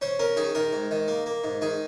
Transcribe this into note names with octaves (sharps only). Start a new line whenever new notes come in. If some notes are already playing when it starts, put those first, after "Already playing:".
C#4 C5
C#4 A#4
D#3 G#4
D#3 A#4
G#2
D#3
A#3
A#3
G#2
D#3 G#4